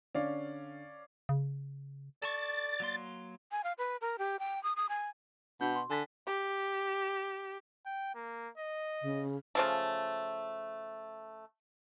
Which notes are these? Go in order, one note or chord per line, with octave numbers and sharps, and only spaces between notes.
D3 C#4 D5 F5
C#3
A4 D5 A5 C#6 A6
F#3 A#3 C6
G#5
F5
B4
A#4
G4
G5
D#6
D#6
G#5
B2 D4 F#4 G6
C6
D3 G#5 A6 B6
G4
G5
A#3
D#5
C#3
C#3 F3 A3